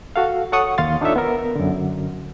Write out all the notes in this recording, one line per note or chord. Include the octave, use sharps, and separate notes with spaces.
F#4 A4 F5
A4 C#5 F#5 C#6 D#6
D#2 F5 C6 A6
D4 D#4 F4 A4 C#5 E5
B3 A#4
F#2 D3